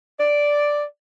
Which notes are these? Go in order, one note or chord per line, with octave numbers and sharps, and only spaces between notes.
D5